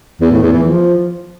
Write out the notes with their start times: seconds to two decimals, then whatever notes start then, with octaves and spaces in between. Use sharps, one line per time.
0.21 E2
0.31 A2
0.42 E2
0.53 E3
0.63 F3